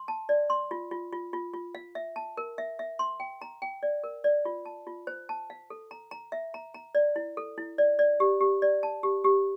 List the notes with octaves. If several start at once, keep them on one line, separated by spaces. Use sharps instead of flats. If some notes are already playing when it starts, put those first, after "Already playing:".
Already playing: C6
A5
D5
C6
F4
F4
F4
F4
F4
F5
E5
A5
A#4
E5
E5
C6
G5
A#5
G5
D5
A#4
D5
F4
A5
F4
C5
A5
F5
A4
A#5
A#5
E5
A#5
A#5
D5
E4
A4
E4
D5
D5
G4
G4
D5
A5
G4
G4